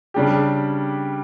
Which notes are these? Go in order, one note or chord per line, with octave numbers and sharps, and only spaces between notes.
C#3 G3 D4 G4